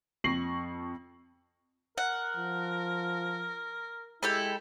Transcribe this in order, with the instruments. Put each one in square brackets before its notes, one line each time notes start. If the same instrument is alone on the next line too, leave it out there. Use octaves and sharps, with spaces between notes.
[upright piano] F2 C#6 A#6 C7 F#7
[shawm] A#4 [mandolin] F#5
[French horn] F3
[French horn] G#3 [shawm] E4 [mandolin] G4 A4 B5